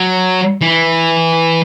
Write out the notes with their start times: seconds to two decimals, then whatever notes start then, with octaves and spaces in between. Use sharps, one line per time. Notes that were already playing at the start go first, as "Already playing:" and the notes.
Already playing: F#3
0.61 E3